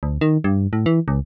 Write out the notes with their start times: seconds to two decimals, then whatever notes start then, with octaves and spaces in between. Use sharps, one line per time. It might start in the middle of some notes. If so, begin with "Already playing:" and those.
0.03 D2
0.21 D#3
0.44 G2
0.73 A2
0.86 E3
1.08 C#2